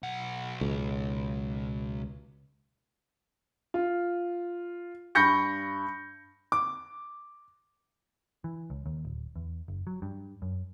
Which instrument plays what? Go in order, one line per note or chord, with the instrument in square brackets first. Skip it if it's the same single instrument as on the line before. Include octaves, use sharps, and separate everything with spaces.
[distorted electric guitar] B1 F#5
[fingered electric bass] C#2
[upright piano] F4
G2 B5 C#6 G6 A#6 C#7
[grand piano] D6
[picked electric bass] E3
C#2
D#2
D1
E2
F#1
F#3
G2
F#2